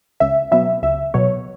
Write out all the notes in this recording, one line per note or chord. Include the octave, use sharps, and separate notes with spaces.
C#2 E5
B2 F#3 B3 E5
C#2 E5
B2 F#3 B3 C#5